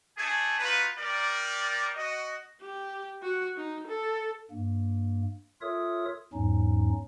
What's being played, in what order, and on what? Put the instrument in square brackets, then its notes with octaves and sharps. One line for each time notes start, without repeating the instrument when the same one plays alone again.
[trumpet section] A3 D4 G#4 A4 G#5
D#4 F4 F#4 B4
G3 A#4 D5
F#4 D#5
[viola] G4
F#4
D#4
A4
[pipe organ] G2 A#3
F4 A4 A#4 C#5 E5 D#6
E2 G#2 F#3 C#4 D#4